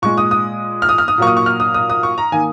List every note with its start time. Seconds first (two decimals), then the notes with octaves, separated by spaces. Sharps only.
0.02 A#2 G#3 C#6
0.18 D#6
0.31 D#6
0.82 F6
0.89 D#6
0.98 F6
1.08 D#6
1.18 A#2 F#3 A#3 C#6
1.27 D#6
1.37 C#6
1.46 F6
1.60 D#6
1.74 D#6
1.90 D#6
2.03 C#6
2.18 A#5
2.32 D#3 A#3 G#5